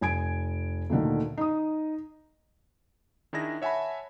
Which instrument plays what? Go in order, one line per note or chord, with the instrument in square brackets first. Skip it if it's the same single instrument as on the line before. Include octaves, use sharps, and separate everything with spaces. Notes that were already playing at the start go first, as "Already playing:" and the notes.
[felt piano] F1 G#5 G#6 D7
D2 A#2 D3 D#3
D#4 D#6
[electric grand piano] D#3 D4 E4 G#4 A#6
C#5 E5 F#5 G#5 A5 B5